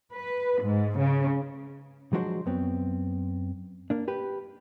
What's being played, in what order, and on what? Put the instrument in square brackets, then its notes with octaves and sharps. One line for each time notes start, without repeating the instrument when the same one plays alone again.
[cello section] B4
G#2
C#3
[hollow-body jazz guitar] F3 F#3 G#3 D4 F#4 C5
F#2 B3 C4
A#3 D4
G4 B4